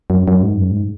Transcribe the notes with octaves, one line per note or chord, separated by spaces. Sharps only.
F#2
F#2
G#2
F#2
G#2